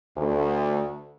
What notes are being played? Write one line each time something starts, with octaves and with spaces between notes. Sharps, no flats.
D2